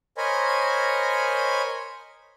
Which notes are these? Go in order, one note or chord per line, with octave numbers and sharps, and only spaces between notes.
A#4 C5 C#5 D#5 G#5 B5